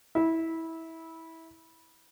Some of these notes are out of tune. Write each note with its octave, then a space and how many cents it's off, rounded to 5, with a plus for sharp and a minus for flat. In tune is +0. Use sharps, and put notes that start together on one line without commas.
E4 -20